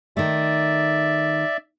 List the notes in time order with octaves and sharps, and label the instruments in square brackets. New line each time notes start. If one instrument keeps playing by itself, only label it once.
[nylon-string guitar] D#3 A3 [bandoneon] D5 E5